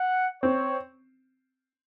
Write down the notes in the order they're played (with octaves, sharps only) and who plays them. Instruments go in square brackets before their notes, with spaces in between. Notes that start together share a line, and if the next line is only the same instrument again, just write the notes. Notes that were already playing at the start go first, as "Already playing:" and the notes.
Already playing: [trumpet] F#5
[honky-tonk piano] C4 [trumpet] C#5